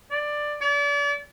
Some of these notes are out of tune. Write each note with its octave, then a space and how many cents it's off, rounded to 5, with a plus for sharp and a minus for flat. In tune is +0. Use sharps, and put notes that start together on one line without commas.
D5 +10
D5 -35